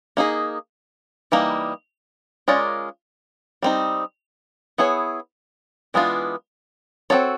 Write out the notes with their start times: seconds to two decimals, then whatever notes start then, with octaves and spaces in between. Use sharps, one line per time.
0.17 A#3 D#4 G#4
1.32 E3 G3 A#3 D#4
2.48 G#3 C#4 F4 A#4 D5
3.62 G3 C4 D#4
4.78 B3 E4 G#4 C#5
5.94 E3 G#3 B3 D4 F4
7.10 C4 D#4 F#4 A4 C#5